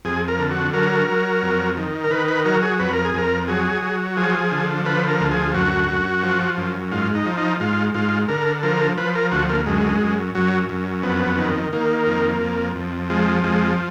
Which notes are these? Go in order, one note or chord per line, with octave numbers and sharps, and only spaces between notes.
F2 G#4
A#4
D3
F#4
F#3 A#4
F#3
F2
D#3
A#4
D#3 B4
B4
F#3 A#4
G#4
F2 B4
A#4
G#4
F2 A#4
F#3 G#4
F#3
F3 G#4
D3
F3 B4
A#4
D2
G#4
F#2 F#4
F#2
F3
F#2
G#2 F4
D#4
F3
D#4
G#2 F4
G#2 F4
D3 A#4
F3 A#4
F3 B4
A#4
D2 F#4
A#3
F#2 G#3
F#2
F#2 F#3
F#2
F2 B3
D#3
D#3 A#3
F2
F2
F2
F3 G#3
F2 G#3